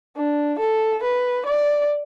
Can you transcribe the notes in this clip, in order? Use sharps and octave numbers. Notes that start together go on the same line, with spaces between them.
D4
A4
B4
D5